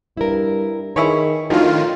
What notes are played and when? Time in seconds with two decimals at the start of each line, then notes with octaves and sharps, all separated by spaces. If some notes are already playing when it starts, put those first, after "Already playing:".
0.17 G2 E4 A#4
0.96 D#3 E4 G#4 B4 C#5
1.50 A2 D#3 F3 F#3 D4 F4 F#4